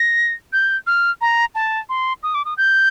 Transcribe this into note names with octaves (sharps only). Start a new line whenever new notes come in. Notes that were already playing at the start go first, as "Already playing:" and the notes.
Already playing: A#6
G6
F6
A#5
A5
C6
D#6
D6
D#6
G6